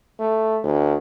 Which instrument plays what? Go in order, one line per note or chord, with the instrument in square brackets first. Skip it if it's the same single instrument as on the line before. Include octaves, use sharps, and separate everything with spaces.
[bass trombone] A3
D2